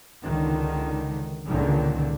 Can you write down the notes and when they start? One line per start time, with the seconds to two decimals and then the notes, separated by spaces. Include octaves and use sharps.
0.25 C#2 D3 D#3
1.48 C#2 A#2 D3 D#3